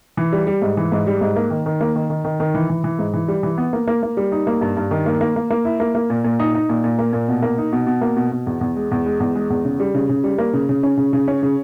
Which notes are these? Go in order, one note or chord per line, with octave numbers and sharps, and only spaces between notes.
E3
G3
G3
G#2
E3
G#2
G3
G#2
A#3
D#3
D#3
A#3
D#3
D#3
D#3
D#3
E3
E3
E3
G#2
E3
G3
E3
B3
A#3
A#3
A#3
G3
D#4
A#3
G2
G2
D#3
A#3
A#3
A#3
A#3
E4
A#3
A#3
A#2
A#2
D#4
D#4
A#2
A#2
A#3
A#2
B2
A#3
D#4
B2
B2
A#3
B2
B2
E2
E2
G#3
E2
G#3
E2
G#3
E2
C#3
G3
C#3
C#3
G3
A#3
C#3
C#3
C#4
C#3
C#3
C#4
C#3